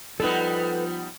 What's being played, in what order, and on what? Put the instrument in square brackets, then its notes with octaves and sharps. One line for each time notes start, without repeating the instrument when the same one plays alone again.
[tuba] F3 [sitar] G3 B3 D#4 [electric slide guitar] A4 B4